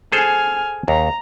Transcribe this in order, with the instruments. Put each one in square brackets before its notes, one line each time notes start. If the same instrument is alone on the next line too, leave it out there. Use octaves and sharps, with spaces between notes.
[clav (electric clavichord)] G#4 A4 C5 [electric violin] G#5 F6
[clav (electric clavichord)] D#2 [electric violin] A#5